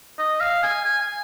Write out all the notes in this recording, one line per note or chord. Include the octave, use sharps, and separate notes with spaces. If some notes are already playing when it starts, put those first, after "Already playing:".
D#5
F5
G#5
G#5
G#5